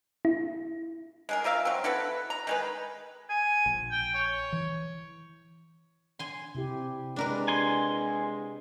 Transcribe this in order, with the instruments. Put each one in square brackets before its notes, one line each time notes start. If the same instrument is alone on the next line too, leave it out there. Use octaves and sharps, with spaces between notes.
[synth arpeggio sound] E4
[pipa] G#3 G#4 A#4
F4 A#4 E5 F5
F#3 C4
E4 F#4 A4 B4
A#5
D#3 G#3 B4
[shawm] G#5
[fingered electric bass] A#1
[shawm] G5
C#5
[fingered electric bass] E3
[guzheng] G#5 C6
[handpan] C3 E4 G4
[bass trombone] G#3 [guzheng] D4 A#4 B4
[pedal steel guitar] G#5 C6